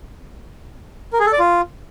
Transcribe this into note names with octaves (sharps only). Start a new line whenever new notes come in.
A#4
G#4
A4
D5
F4